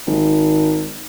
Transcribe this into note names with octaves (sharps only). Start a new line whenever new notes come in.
G#1